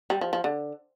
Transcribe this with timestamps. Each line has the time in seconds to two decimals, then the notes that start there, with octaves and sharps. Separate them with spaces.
0.10 G3
0.21 F3
0.33 F3
0.44 D3